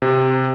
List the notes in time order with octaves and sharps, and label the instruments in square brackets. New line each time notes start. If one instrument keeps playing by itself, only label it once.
[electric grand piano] C3